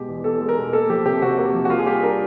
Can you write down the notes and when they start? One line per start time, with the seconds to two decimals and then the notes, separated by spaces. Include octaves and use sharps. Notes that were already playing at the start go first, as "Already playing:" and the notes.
Already playing: B2 G#3 G4
0.08 E2
0.24 E2 A4
0.41 G#3
0.49 A#4
0.58 B2
0.73 A#3 A4
0.89 F3 G4
1.05 C3 G4
1.22 C3 F#4
1.38 A#3
1.54 F3
1.65 F#4
1.70 A#3 F4
1.79 G#4
1.86 G3 G4
2.03 D4 A#4